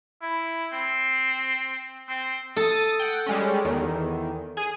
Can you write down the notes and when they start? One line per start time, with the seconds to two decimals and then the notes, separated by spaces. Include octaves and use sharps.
0.22 E4
0.72 C4
2.09 C4
2.57 A4 D#6 A6
3.00 F#5 G5
3.26 G3 G#3 C#4
3.65 E2 D#3
4.57 G#4 G#5